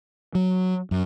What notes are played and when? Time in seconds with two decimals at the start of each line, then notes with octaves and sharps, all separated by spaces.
0.35 F#3
0.91 F#2